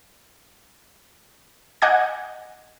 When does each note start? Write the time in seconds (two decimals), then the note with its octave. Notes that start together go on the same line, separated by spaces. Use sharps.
1.82 D#5 F#5 G#5 D6 G6 G#6